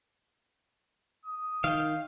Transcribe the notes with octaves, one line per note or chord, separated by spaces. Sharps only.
D#6
D#3 F5 G5